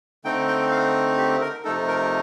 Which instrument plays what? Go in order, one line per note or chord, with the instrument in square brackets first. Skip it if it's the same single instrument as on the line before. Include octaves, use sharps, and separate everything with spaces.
[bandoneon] D3 A3 C4 D#4 G5
G5
F5
G4
A#4
C3 F3 A3 D#4 A4
A#4